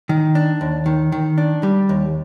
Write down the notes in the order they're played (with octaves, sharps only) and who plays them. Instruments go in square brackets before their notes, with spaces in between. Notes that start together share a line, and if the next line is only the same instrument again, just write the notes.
[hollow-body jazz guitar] D#3
D4
D#2
D#3
D#3
D4
G3
D#2